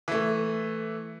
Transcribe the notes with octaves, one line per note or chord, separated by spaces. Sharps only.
E3 A3